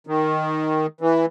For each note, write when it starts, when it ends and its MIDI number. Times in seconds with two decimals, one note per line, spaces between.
0.07 0.86 51
1.01 1.26 52